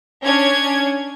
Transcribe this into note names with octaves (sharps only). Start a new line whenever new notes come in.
C#4 D4 G#6